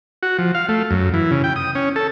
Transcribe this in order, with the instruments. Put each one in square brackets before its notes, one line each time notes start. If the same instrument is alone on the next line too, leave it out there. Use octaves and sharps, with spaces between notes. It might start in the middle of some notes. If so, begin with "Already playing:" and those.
[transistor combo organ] F#4
F3
F5
A3
F#2
E3
C#3
G5
D#6
C#4
A4